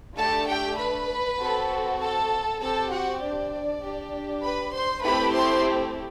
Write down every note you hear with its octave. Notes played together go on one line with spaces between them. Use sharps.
A3 D4 G4 A4 A5
G4 G5
B4 B5
C4 F#4 A4
A4 A5
C4 G4 A4 A5
F#4 F#5
D4 D5
D4 G4
B4 B5
C5 C6
A3 C4 E4 G4 B4 B5
C5 C6